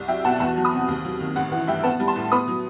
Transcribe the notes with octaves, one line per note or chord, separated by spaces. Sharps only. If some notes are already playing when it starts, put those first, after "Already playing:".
Already playing: C2
F#3 E5 G5
B2 F#5 A5
E2 F#5 A5
F#3
B5 D#6
C3
D#2
F#3
D#3
A1 F#5
E3 F#5
G2 E5 G5
B3 F#5 A5
G3
A5 C6
A2
B3 B5 D#6
F#3